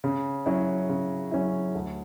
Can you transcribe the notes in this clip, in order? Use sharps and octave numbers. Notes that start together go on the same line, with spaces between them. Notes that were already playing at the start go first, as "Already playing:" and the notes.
C#3
F#3 C#4 E4
C#3
F#3 C#4 E4
D2